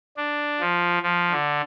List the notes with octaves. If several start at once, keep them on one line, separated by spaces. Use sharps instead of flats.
D4
F3
F3
D3